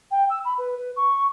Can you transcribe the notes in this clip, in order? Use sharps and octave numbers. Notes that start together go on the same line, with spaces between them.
G5
E6
B5
B4
B4
C#6